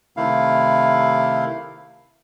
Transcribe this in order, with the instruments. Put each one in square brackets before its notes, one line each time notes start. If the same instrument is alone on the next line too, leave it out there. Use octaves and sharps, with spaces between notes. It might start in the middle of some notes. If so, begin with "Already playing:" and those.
[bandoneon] C3 D#3 A3 E4 F5